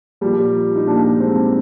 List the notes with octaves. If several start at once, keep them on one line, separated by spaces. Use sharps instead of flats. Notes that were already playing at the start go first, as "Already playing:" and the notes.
A#2 F3 G3 A#3
D#4
A#2 F3 A#3 D4
G#3 C4